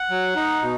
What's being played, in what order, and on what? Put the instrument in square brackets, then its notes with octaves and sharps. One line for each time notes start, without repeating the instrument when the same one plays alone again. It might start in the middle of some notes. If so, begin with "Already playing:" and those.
Already playing: [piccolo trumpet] F#5
[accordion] F#3
D#4
B2